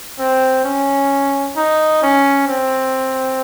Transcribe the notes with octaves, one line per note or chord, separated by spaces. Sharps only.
C4
C#4
D#4
C#4
C4